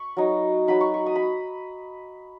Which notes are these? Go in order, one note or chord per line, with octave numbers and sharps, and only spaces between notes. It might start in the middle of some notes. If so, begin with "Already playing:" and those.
Already playing: B5 C#6
F#3 D#4
F#3 D#4 B5
C#6
C#6
D#6
B5